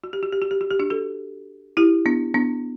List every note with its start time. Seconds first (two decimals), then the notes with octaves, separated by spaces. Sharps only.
0.04 F#4
0.13 G4
0.23 F#4
0.32 G4
0.42 F#4
0.51 G4
0.61 F#4
0.70 G4
0.79 D4 F#4
0.90 F#4 A4
1.77 E4 G4
2.06 B3 D4
2.34 B3 D4